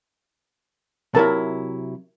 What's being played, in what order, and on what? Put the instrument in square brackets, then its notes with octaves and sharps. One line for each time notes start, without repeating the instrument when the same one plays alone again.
[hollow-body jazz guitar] C3 F#3 E4 [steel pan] A#4 A5